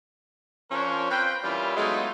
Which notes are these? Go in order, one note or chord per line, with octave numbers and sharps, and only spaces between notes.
F3 C#4 D4 A#4 C5 C#5
C4 B4 F5 G5
E3 G3 A#3 C#4 E4 F4
F#3 G#3 A3 B3 D#4 F4